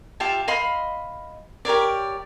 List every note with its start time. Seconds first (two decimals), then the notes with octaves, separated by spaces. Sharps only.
0.20 F4 G4 E5 A5
0.48 D#5 F5 B5 C6
1.65 G4 A#4 C#5 D5